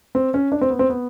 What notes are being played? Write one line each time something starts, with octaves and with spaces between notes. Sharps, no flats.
C4
C#4
D4
C4
B3
C4
B3